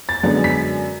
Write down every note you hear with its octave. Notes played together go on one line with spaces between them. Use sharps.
A6
F#2 D3 G#3 B3 D4
B6